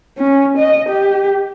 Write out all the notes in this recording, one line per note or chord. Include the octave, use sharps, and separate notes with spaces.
C#4
D#5
G4